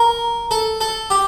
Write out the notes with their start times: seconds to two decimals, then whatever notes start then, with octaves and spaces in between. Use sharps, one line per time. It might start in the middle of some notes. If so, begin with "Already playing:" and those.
Already playing: A#4
0.51 A4
0.81 A4
1.10 G4